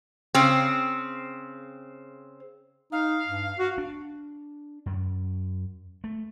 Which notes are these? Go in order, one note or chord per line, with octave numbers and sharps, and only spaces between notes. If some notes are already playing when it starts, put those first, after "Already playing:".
C#3 C4
D#4 F5
G2
F#4
D4
F#2
A3